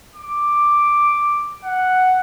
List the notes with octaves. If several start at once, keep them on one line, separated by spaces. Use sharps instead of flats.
D6
F#5